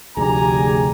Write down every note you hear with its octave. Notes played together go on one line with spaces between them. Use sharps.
F1 D2 A3 G4 G#4 D5 G#5 A#5